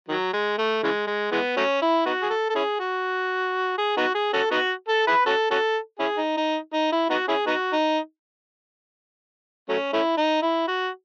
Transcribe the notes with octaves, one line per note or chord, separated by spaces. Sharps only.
D#3 F#3
G#3
A3
C#3 E3 G#3
G#3
E3 G#3 B3
F#3 A3 C#4
E4
B3 D#4 F#4
G#4
A4
A4
C#4 E4 G#4
F#4
G#4
B3 D#4 F#4
G#4
C#4 F#4 A4
B3 D#4 F#4
A4
E4 G#4 B4
C#4 F#4 A4
C#4 F#4 A4
C#4 E4 G#4
D#4
D#4
D#4
E4
B3 D#4 F#4
C#4 E4 G#4
B3 D#4 F#4
D#4
F#3 A3 C#4
A3 C#4 E4
D#4
E4
F#4